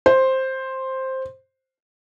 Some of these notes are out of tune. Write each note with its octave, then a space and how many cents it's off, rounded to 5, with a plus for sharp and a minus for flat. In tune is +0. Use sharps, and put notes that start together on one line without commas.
C5 +5